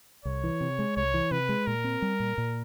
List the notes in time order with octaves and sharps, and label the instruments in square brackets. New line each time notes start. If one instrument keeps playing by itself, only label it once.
[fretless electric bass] C2 [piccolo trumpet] C#5
[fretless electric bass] E3
C3
G#3
[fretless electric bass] C2 [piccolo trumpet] C#5
[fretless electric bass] E3
[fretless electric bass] C3 [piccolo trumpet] B4
[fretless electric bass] G#3
[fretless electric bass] A#2 [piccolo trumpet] A#4
[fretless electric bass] C4
G3
A#2
A#2